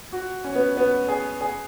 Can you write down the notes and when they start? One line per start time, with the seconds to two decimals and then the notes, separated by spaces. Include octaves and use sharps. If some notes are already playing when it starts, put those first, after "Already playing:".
0.12 F#4
0.44 C#4
0.55 B3
0.77 B3
1.08 G#4
1.41 G#4